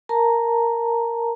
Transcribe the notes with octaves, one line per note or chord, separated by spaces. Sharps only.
A#4 A5 A#5